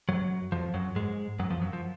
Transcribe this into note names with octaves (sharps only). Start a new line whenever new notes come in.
F#2 F#3
F2 F3
F#2 F#3
G#2 G#3
F#2 F#3
F2 F3
F#2 F#3
F3